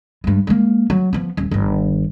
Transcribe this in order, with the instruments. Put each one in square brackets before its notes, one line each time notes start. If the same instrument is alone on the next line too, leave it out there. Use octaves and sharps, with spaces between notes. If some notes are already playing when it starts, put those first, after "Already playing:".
[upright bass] G2 G#3
G#3 A#3
F#3
F3 B3
D#1
G1 D#3